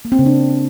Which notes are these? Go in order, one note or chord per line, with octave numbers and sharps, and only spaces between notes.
A#3
C4
C#3
D4